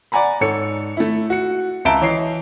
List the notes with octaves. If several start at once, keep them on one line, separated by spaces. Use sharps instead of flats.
D5 F#5 G#5 A#5 B5
G#2 A4 C#5 C#7
A3 E4
F#4 C#7
C#2 E5 A5 A#5 D7 G7
E3 C#5 D#5 C7